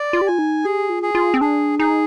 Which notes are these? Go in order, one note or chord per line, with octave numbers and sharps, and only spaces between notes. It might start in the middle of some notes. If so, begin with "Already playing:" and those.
Already playing: D5
F4
G4
F4 G#5
D#4
G4 G#4
F4
G#4
F4
C4
D4 G#4
D#4 G#4